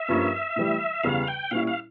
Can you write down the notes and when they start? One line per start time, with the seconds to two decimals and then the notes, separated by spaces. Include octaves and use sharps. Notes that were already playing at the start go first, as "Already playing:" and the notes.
Already playing: E5
0.09 G2 F3 A#3 C#4
0.56 A2 E3 G3
1.03 E2 C#3 G3 F5
1.28 G5
1.51 A#2 G3 C#4 E4 F5
1.67 F5